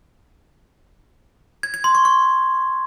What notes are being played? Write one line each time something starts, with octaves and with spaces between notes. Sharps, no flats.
G#6
G#6
C6
C#6
C#6